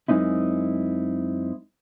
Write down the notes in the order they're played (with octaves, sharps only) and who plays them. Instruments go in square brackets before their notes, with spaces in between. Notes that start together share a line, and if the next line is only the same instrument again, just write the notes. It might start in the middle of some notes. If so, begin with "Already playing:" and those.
[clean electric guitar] F#2 G#3 C4 D#4 E4